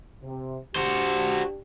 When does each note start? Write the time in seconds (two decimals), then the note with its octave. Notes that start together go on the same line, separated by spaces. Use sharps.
0.23 C3
0.75 D4 F#4 G4 C5